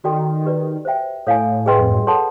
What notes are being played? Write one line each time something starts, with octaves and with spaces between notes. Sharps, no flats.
D#3 F#4 A4 D5 G5 C6
G4 B4 D5
C5 E5 G5
A2 A4 C#5 F5 G#5
G#4 B4 D#5 G5 C6
F2
F#2
G2
A4 C#5 F#5 A5 C6